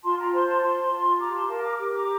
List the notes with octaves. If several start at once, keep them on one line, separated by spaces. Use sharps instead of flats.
F4 A5 C6
G5 A#5
C5 A5 C6
A5 C6
F4 A5 C6
F4
G4 A#5 D6
A5 C6
A#4 F5 A5
A#5 D6
G4 D6
A#5 D6